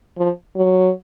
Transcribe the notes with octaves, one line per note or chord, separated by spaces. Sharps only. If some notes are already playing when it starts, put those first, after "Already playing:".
F3
F#3